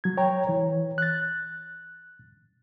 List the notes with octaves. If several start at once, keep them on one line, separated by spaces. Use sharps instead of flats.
F#3 G#6
C#5 G5 A#5
E3 C#5
F#6 A6